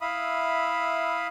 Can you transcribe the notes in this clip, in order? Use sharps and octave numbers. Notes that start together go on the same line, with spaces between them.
E4 E5 F5 B5 D#6